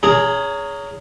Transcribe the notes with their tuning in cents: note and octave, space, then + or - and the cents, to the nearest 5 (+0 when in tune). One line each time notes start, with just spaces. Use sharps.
C#4 +25 G#4 +0 A#5 -15